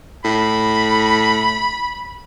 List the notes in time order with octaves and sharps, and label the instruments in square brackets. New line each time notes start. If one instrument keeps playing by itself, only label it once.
[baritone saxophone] A2 [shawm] B5